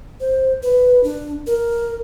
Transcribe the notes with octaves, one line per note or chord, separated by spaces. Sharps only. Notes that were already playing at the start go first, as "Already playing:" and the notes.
C5
B4
D4
A#4